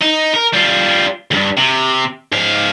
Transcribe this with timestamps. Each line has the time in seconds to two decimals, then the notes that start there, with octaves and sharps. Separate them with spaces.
0.01 D#4
0.34 A#4
0.54 G3 F4
1.31 C#2 G2
1.57 C3
2.32 G#2 F5